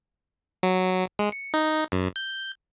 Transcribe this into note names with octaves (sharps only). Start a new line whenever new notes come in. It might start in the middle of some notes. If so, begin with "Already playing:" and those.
F#3
G#3
C#7
D#4
F#2
G6